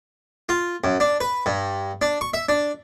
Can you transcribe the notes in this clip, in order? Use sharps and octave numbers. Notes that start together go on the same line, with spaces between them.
F4
F#2
D4
B4
G2
D4
C#6
E5
D4